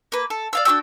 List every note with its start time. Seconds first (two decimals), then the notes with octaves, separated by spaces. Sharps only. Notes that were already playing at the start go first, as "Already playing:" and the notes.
0.12 A#3 B4
0.30 A4
0.53 D5 F5 E6
0.65 D4 F#4 G5 E6